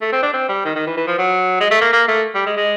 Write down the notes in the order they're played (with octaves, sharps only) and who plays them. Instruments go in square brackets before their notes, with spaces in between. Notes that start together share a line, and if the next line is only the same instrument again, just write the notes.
[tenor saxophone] A3
C4
D4
C4
G3
D#3
D#3
E3
E3
F3
F#3
G#3
A3
A#3
A#3
A3
G3
G#3
G#3